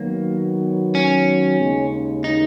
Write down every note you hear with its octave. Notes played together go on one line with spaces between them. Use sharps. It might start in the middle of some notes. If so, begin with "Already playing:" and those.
Already playing: D#3 F#3 A#3 B3
C#4
D#2 C#3 G#3
D#4